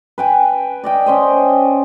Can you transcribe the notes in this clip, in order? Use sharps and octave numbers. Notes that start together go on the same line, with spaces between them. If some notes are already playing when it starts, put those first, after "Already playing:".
B4 G5 G#5
D5 D#5 G5
C#4 C5 D#5